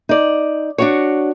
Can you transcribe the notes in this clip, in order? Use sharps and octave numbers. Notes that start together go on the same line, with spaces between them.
D#4 D5
D4 F#4 C#5